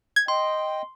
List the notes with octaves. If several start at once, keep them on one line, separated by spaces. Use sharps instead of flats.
G#6
D#5 G5 C6